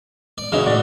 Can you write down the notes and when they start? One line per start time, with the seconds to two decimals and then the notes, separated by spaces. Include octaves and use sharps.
0.38 D5
0.52 C#3 E3 C#4 D#4 F#4
0.66 A2 F#4 D5